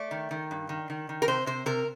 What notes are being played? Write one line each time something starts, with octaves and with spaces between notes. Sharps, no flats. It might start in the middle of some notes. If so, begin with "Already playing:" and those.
Already playing: A3 D5
D#3
D#3
G2
D#3
D#3
D#3
A#4
C3 C5
C3 C5
C3 A#4